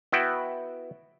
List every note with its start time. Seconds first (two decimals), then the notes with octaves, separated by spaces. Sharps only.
0.12 B3 E4 F#4 G5